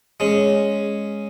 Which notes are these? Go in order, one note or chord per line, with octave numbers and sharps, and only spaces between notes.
G#3 C#4